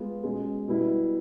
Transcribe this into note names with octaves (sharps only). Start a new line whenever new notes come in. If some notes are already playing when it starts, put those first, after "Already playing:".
Already playing: G#3 B3 F4
B2 G#3 C#4
B2 G3 B3 E4